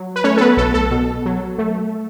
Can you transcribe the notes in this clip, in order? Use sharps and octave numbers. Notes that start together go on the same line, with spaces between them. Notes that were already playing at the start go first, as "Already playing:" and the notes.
Already playing: F#3
B4
A3 C#4 C#5
A4
B3 B4
B1 A4
A4
B2
F#3
A3